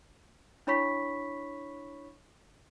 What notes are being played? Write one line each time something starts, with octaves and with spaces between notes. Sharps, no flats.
D4 E4 C#5 B5 C#6 B6